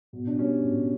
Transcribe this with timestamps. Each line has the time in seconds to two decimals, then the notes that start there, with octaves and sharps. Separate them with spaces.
0.13 B2
0.27 D4
0.38 G3 C#4
0.64 B2